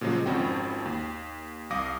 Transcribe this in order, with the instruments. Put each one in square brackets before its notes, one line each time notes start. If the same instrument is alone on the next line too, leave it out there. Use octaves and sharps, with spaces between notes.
[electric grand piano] A#2 C#3 F3 F#3 G#3
G#1 F2 C4 C#4 F#4 G5
D#2
C2 F5 D6 D#6 A#6